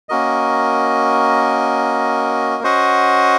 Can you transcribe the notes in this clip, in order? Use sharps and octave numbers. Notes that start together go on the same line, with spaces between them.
A#3 C#4 F#4 A#4 D#5
C#4 F#4 C5 D#5 F#5